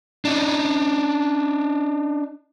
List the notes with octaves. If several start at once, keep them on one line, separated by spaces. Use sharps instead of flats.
D4 D#4